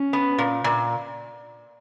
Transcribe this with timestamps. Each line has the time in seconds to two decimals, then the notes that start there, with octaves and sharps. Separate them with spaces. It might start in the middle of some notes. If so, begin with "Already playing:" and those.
Already playing: C#4
0.13 B3
0.38 A#2
0.64 A#2